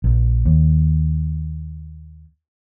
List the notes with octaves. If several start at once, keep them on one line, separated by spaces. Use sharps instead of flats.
A#1
D#2